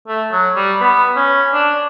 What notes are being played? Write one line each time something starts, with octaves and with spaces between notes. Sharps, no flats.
A3
F#3
G3
B3
C#4
D4